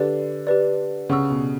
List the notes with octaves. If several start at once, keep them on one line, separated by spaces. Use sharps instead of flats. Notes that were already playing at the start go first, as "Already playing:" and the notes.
Already playing: D3 G4 B4 D5
G4 B4 D5
C#3 F#5 C#6 E6
B2